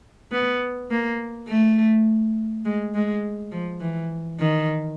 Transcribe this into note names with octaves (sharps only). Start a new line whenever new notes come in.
B3
A#3
A3
G#3
G#3
F3
E3
D#3